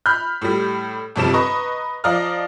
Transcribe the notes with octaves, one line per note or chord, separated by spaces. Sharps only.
B5 F6 G6
A2 G3
G1 F2 C3 F3 G3 E7
B4 D#5 A#5 C#6
F3 D5 D#5 F5 A#5 F6